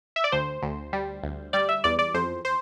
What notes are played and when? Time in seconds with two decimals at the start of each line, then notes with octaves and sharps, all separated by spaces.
0.16 E5
0.24 D5
0.32 D2 C5
0.62 D2
0.93 G3
1.23 D2
1.53 G3 D5
1.69 E5
1.84 E2 D5
1.99 D5
2.14 F2 C5
2.45 C5